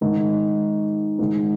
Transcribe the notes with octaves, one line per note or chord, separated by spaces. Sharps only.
G#2 D#3 D#4
G#2 D#3 D#4